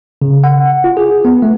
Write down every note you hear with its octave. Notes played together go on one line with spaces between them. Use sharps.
C#3
F#5
F4
G#4
B3
A3